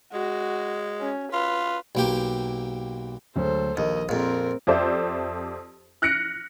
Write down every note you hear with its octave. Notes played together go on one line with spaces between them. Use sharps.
G#3 F#4
C#4
F4 B4
B1 A#3 G4
D2 F#3 G#3 A4 C5
A#1 D#2 D#5
A#1 F2 C4 A#4 F5 A#5
F2 G4 A4 C5 D5 E5
F6 F#6 A#6 C#7 D7